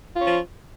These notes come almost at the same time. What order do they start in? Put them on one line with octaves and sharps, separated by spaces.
F4 C#4 F3